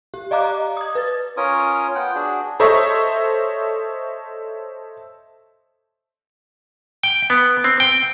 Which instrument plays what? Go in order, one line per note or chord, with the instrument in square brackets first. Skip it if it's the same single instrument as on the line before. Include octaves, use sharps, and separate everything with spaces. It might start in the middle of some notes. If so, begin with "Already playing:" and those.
[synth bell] G4
D5 D#5 F5 A#5 D6 F#6
D#6 G#6
B4 A6
[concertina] C#4 F4 A#4 C#5 D#6
B3 F4 F#5 G5
D4 F#4 G#4
[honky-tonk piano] A4 C5 C#5 D#5 E5 C#6
[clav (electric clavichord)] G5
B3
C4
G5